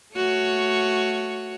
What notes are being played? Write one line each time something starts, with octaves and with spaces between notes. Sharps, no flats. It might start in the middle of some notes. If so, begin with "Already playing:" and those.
A3 F#4 C#5